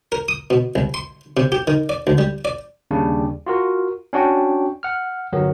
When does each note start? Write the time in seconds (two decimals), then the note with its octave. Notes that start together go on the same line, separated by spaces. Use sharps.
0.12 A#4
0.28 D#6
0.50 B2
0.76 C2
0.94 C6
1.37 C3
1.52 G4
1.67 D#3
1.89 D5
2.07 D2
2.18 G3
2.45 D5
2.91 D#2 C#3 G3 D4
3.46 F4 F#4 A#4
4.13 C#4 D4 F#4 G5
4.83 F#5 F6
5.33 G1 F#3 B3 A#4